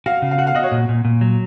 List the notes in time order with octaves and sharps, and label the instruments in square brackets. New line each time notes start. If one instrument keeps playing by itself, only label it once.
[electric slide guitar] F#4 [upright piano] F5
[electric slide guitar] C#3
[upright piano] F5
[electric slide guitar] F#4 [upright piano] F#5
[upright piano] F5
[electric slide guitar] F#4 [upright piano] D#5
[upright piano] C#5
[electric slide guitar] A#2
A#2
A#2
F#3